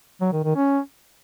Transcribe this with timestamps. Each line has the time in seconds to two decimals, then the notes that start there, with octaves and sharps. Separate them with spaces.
0.21 F#3
0.32 D#3
0.44 D#3
0.56 C#4